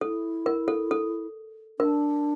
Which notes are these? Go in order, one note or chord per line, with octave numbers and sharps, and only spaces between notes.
E4 A4
A#4
A4
A4
D4 A#4